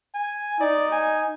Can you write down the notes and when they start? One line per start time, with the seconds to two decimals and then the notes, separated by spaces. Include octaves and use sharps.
0.15 G#5
0.60 D#4 D5
0.92 G#5